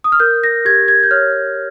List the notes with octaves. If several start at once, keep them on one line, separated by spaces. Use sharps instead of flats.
D#6
F6
A#4 G6
A#6
G4 G#6
G#6
G6
C#5 F6